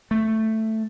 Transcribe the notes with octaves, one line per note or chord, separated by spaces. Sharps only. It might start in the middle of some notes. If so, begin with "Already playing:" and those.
A3